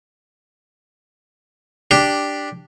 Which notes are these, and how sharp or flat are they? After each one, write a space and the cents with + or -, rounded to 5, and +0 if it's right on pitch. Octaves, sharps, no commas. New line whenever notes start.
D4 +0 G4 +0